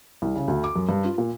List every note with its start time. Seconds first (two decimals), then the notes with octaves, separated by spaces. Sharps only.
0.22 C2
0.35 C#3
0.48 D2
0.64 D6
0.76 F#2
0.89 G2
1.05 F4
1.18 A#2